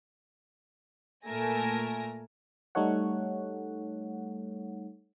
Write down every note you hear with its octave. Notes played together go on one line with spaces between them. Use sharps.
A#2 A3 A#4 G#5 A5 A#6
G3 A3 D#4 A4 C#5 F#5